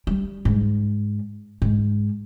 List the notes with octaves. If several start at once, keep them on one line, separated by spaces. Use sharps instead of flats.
G3
G#2
G#2